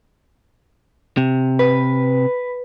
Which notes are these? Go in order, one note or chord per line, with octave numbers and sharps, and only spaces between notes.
C3
B4